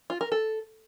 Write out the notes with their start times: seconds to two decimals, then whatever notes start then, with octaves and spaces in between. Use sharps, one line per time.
0.10 F4
0.21 A#4
0.32 A4